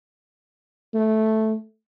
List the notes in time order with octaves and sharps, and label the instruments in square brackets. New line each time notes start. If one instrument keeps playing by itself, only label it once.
[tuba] A3